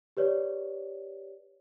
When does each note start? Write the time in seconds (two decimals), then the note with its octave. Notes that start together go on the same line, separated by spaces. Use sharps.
0.17 G4 B4 C#5 D5